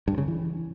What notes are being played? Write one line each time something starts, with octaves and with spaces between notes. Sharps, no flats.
G2
C#3
E3